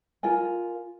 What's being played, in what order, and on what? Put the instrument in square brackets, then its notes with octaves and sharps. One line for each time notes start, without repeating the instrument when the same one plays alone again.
[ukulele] F4 A#4 G#5